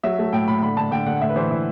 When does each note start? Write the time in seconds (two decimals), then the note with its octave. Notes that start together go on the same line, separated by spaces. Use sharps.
0.03 F#3 E5
0.18 A3
0.33 A2 G5
0.48 A2 B5
0.62 D3 B5
0.77 D3 A5
0.91 D3 G5
1.06 D3 F#5
1.21 A2 E5
1.29 B4
1.36 E3 C5
1.50 A2 E4